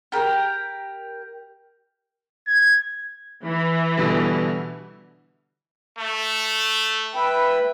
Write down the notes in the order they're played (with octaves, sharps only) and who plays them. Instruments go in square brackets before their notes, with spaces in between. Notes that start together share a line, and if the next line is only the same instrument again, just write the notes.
[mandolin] G4 A#4
[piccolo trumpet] G#6
[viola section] E3
[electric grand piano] B2 D3 G3
[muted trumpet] A3
[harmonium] B4 E5 G5